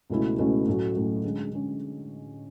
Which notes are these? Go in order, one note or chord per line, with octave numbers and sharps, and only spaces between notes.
C#2 B2 A3 C#4 E4
C#2 B2 A3 C#4 E4
A2 F#3 A3 C#4 F#4
A2 F#3 A3 C#4 F#4
D3 G#3 C#4
D3 G#3 C#4